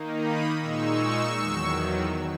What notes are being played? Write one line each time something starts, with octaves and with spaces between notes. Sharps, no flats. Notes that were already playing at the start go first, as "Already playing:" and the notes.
Already playing: D#3 A#3 D#4
B5 D#6
A#2 G#3 D#4 C#6 E6
E2 D#3 F#3